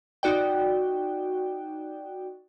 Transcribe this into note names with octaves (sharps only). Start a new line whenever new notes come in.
D#4 F#4 D5 G5